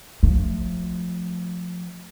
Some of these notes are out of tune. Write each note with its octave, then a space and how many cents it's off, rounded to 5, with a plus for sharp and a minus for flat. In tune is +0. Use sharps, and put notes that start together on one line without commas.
F3 +20 A3 +0